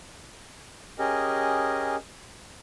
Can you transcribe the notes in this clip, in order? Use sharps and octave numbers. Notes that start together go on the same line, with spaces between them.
C#4 G4 G#4 A#4 D#5